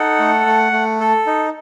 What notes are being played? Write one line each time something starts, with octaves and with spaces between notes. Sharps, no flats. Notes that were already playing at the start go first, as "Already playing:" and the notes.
Already playing: D#4 A4 F#5
A3
A3
A3
A4
D#4